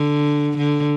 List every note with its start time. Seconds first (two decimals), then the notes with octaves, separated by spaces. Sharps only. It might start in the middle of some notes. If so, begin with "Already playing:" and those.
Already playing: D3
0.57 D3